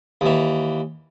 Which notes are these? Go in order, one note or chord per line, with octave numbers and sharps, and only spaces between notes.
D#2 E3